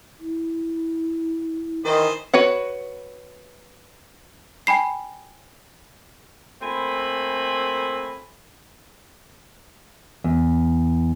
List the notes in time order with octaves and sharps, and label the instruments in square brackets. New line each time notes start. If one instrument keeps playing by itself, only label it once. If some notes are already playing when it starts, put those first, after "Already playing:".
[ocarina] E4
[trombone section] D#3 [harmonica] E3 C5 D#5
[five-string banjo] F#4 B4 C#5 F#5
[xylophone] G5 G#5 B5 C7
[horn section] A#2 A3 C4 G#5 B5
[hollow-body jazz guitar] E2